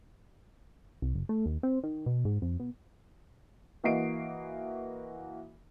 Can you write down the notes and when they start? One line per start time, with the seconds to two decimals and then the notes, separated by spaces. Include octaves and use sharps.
1.02 C2
1.15 F#1
1.29 A3
1.46 D#2
1.63 C4
1.84 D#3
2.06 B2
2.25 G#2
2.42 F2
2.60 B2
3.84 E3 A#3 F#4 D#5 C7 D7